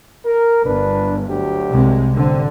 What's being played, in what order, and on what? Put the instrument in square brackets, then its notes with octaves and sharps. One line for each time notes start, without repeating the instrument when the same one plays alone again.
[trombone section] A#4
[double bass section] G1 [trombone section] D4 B4
[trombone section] D2 F#3 G4
[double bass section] C2 C3 G#3
[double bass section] A1 D3 [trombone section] C4